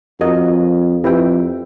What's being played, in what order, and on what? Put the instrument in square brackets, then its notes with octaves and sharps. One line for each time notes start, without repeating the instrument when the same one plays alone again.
[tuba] F2 [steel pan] F#4 A#4 D#5
[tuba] F2 [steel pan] E4 G4 B4 E5 G5